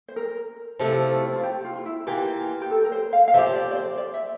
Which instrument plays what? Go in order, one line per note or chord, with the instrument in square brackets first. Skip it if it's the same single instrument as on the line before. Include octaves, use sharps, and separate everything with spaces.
[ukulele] C5
A#4
[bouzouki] C3 F3 A3 E4 [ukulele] A4
[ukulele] E4
F4
G4
F4
F4
E4
[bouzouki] E3 A#3 F4 [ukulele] G4
[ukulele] G4
A4
A#4
C5
F5
F5
[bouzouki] F3 A3 C4 G4 [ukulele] E5
[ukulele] D5
D5
C5
D5
E5